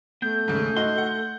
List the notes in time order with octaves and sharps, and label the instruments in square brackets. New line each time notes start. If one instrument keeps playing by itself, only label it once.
[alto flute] A3 [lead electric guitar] B3 [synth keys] G6
[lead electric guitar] D#2 [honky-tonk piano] G#2 C#3
[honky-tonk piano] D#4 F#4 [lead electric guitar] C6
[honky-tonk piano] F#5